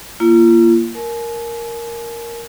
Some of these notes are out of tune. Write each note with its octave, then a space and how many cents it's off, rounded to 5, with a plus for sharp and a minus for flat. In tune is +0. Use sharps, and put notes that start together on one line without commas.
A#3 +0 F4 -40
A#4 +0 G#5 +45